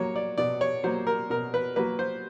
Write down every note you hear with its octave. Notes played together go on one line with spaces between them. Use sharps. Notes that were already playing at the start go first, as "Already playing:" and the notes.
Already playing: F#3 A#3 C#5
D5
B2 D5
C#5
F#3 A#3 C5
A#4
B2 A#4
B4
F#3 A#3 B4
C5